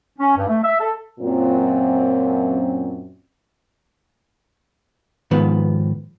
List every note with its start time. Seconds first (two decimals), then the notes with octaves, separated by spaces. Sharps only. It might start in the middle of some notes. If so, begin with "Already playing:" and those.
0.18 C#4
0.35 G2
0.48 A3
0.62 E5
0.80 A4
1.20 F#2 A#2 C4
5.31 G#2 D#3 F3 B3